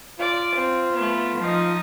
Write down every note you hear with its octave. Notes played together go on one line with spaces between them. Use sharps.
F4 D5
C4
A3 B3
F3 D#4 D#5